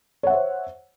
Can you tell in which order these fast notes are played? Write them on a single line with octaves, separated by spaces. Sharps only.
C#5 F#5 E5 C5